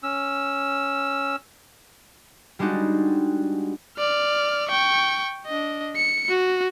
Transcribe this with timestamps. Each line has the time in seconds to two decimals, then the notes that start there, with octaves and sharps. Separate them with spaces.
0.03 C#4 E6
2.59 G3 G#3 D4 D#4 F#4
3.98 D5 F6
4.69 G5 C#6
5.46 D4 D#5
5.96 C#7
6.29 F#4